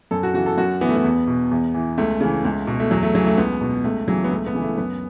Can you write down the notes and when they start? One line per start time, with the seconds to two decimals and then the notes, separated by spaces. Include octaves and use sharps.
0.11 F#2 A4
0.23 F#4
0.34 C#3 E3 F#4
0.46 A4
0.57 F#2 F#4
0.81 E3 B3
0.89 A3
0.96 B3
1.04 E2
1.28 B2
1.51 E2
1.74 E3
1.98 C#2 A3
2.21 C#3 E3
2.45 C#2
2.67 B2
2.80 A3
2.91 E2 F#3
3.03 A3
3.15 C#3 E3 F#3
3.26 A3
3.38 C#2 B3
3.61 B2
3.84 C#2 A3
4.08 C#3 E3 F#3
4.24 B3
4.32 C#2 A3
4.46 B3
4.55 C#3 E3
4.62 A3
4.77 F#2 B3